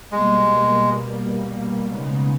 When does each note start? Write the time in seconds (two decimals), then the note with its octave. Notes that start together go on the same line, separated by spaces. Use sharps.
0.12 B2 G3 G#3 A#3
1.86 C#3 G#3 B3 D#4